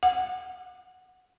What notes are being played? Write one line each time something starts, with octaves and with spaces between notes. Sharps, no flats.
F#5